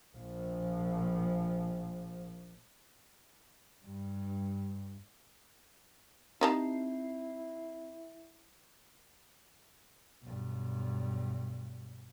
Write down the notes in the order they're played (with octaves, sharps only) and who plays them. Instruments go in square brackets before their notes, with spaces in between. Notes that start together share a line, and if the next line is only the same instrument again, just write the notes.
[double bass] A#1 F3
[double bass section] G2
[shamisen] G3 D#4 A5 [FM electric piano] C4 C7 [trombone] E4
[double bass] B1 G2